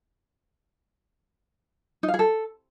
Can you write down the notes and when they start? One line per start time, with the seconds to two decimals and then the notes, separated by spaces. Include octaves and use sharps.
2.03 D#4
2.08 F5
2.14 G#4
2.19 A4